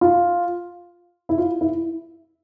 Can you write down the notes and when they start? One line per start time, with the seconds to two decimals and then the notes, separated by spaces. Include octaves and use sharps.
0.01 F4
1.29 E4
1.38 F4
1.61 E4